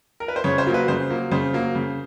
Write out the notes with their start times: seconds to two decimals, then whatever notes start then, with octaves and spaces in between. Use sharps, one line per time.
0.20 A#4
0.28 B4
0.36 C5
0.44 C#3 C#5
0.58 C5
0.67 F#3 A#3
0.74 B4
0.88 C#3 C5
1.10 F#3 A#3
1.31 C#3 C5
1.53 F#3 A#3
1.75 C#3